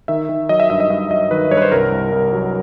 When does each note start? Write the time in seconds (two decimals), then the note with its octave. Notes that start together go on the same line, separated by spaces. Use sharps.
0.08 D#3 E5
0.29 D#3
0.49 F#3 D#5
0.60 E5
0.70 G2 E5
0.80 D#5
0.90 G2 E5
1.11 F#3 D#5
1.31 D#3 B4
1.51 G2 C#5
1.57 B4
1.62 C5
1.72 C2 A#4
1.92 C2
2.12 C2
2.33 F#3